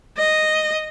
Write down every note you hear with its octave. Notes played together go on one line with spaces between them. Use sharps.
D#5